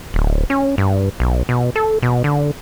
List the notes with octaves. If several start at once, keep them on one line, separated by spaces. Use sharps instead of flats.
D1
C#4
G2
B1
B2
A4
B2
D3